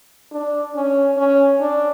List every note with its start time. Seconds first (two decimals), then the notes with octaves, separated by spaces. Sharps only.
0.32 D4
0.75 C#4
1.17 C#4
1.60 D4